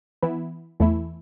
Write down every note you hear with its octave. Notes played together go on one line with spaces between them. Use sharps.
E3 B3 E4
E2 E3 A3 E4